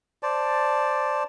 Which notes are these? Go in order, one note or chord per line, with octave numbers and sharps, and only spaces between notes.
C5 D5 A5